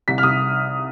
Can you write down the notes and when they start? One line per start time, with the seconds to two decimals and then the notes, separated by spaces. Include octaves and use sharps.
0.08 C2 B6
0.18 F6
0.23 C2 D#6